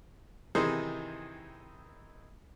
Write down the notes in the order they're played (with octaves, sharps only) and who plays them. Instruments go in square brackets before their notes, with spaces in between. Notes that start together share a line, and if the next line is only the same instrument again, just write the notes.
[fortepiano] C3 D#3 E3 D#4 G#4 C5